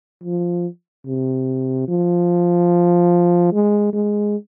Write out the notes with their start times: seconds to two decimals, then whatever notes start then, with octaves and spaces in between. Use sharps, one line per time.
0.23 F3
1.06 C3
1.88 F3
3.53 G#3
3.93 G#3